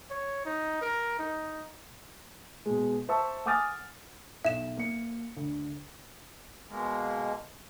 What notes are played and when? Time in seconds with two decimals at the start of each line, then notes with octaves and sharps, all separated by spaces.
0.10 C#5
0.45 D#4
0.81 A#4
1.19 D#4
2.66 B2 G#3
3.09 C5 E5 A5 C#6 E6
3.46 F#5 G#5 D6 D#6 F6 A6
4.45 B1 E5 E7
4.77 A#3 C#7
5.37 D2
6.67 B2 G#3 A#3